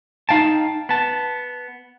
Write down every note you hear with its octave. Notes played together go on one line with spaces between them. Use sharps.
D#4 F5 G5 A5
B3 A5